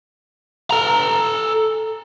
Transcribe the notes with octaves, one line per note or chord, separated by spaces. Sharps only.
A4 A#5